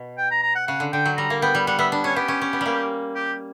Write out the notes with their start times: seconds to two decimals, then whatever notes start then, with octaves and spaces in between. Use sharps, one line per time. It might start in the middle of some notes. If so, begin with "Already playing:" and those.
Already playing: B2
0.18 G5
0.31 A#5
0.43 A#5
0.55 F#5
0.67 C#3 F#5
0.80 D3
0.93 D3 G5
1.06 F#3
1.17 G3 A#5
1.30 A#3
1.42 B3 G5
1.55 G3
1.67 G3 F#5
1.79 B3 E5
1.92 D4
2.04 C#4 C#5
2.16 B3 G4
2.28 C#4
2.41 C#4
2.53 B3
2.61 G3 A#3
3.15 G4